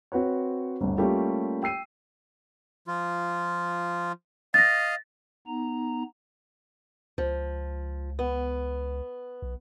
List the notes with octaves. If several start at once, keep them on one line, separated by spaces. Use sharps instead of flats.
C4 F#4 B4 C#5
G1 D2
G3 A3 A#3 C#4 F4 G4
G5 E6 C7 D#7
F3 F4
D#5 F5 A6 A#6
B3 D#4 A#5
C#2 F3
B3
B1